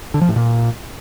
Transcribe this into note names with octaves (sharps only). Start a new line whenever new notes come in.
D3
F3
A2
A#2